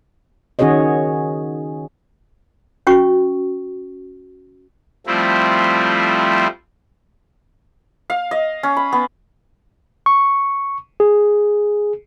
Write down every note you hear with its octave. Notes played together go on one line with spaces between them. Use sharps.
D#3 C#4 F#4 G#4 C#5 D#5
C#4 F#4 C#6
F3 G3 A3 C4 E4
F5
D#5
C#4
B5
B3
C#6
G#4